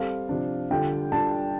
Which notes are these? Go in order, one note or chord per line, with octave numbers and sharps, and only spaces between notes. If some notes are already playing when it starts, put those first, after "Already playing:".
Already playing: G3 C4 A4 F5
C3 F3 D4
D3 G3 F4 A4 G5
G3 D4 F4 A4 A5